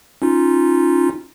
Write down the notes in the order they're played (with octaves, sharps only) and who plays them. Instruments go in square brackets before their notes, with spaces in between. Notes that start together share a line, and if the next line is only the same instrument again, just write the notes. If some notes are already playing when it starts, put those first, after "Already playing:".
[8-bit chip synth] C#4 D#4 F4